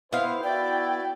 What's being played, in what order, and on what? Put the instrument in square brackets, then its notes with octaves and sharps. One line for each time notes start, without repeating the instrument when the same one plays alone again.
[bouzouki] B3 F5 [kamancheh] E4 [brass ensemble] C5
[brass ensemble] E4 F#4 [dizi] D5 [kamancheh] G5